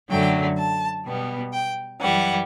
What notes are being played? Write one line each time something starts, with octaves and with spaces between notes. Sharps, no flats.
F#2 D3 F#3 A3 G5
A5
B2 G3 B3
G5
F#2 E3 G3 F#5